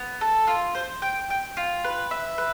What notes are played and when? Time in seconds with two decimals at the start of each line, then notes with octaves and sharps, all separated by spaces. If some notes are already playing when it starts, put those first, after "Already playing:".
Already playing: B3
0.21 A4
0.47 F4
0.75 C5
1.02 G5
1.30 G5
1.57 F4
1.84 B4
2.11 E5
2.38 B4